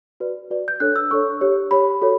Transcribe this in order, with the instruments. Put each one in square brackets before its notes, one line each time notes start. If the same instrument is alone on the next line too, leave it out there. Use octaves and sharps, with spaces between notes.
[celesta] F#4 B4 D5
F#4 B4 D5
G6
D4 A4 C#5 F#6
E6
D4 A4 C#5 C#6
G4 C#5
G4 C#5 B5
F#4 A4 C#5